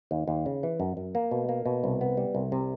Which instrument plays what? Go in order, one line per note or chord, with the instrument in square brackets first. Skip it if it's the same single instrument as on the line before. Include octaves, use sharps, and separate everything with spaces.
[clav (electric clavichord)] D#2
D#2
C#3
E3
F#2
F#2
A#3
B2
A#3
B2
C2
B3
G3
C2
C3